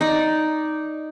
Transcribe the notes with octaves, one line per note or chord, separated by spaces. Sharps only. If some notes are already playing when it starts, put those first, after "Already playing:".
D#4 D5